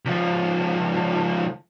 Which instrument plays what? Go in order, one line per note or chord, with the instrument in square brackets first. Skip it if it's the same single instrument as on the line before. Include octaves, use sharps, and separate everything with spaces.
[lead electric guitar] C#2 F3